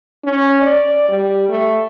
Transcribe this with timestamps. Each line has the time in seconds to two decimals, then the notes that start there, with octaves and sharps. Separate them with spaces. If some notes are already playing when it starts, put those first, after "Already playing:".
0.24 C#4
0.62 D5
1.09 G3
1.49 A3